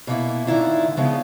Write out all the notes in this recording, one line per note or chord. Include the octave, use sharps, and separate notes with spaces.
B2 A#3 E4
A2 D3 D#3 E4 F4
C#3 F3 G#3 B3